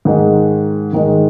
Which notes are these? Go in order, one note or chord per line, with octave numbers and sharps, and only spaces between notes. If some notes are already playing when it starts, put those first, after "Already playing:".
G#2 D#3 G#3 D#4
G#2 D#3 G#3 D#4